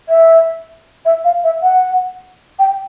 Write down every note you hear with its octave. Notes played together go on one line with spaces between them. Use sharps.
E5
E5
F5
E5
F#5
G5